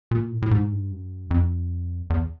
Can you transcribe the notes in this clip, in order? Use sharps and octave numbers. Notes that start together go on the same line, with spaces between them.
A#2
A2
A2
G#2
G2
F#2
F2
E2